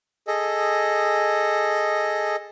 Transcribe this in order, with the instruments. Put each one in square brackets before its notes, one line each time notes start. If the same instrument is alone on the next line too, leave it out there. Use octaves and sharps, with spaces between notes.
[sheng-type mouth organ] G#4 A4 D#5